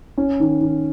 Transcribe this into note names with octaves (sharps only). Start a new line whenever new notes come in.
C#4
D#3
D#3